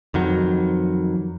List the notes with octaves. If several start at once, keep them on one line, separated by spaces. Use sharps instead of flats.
F2 D#3 F#3